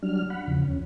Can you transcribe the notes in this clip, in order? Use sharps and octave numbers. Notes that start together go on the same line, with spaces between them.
F#3 G3 D4 F6
F#5 B5
E2 C#3 F3
D#2 C#4